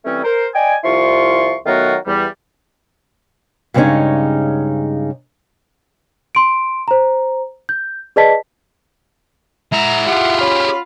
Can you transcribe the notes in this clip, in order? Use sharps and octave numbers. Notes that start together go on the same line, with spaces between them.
E3 G3 A3 C4 C#4
A#4 C5
D5 D#5 G5 G#5
C2 F3 E4 F4 C6 C#6
D#3 F#3 A3 B3 F4 F#4
E2 G3
G2 C#3 G#3 A#3 C#4 D#4
C6 D7
C5 A#5
G6
G#4 B4 D5 D#5 A5 B6
G#3 E4 F#5 A#5
F4 G4 G#4 F#5
C#4 B5